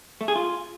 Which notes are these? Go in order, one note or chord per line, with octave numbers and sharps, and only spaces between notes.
A3
G#4
F4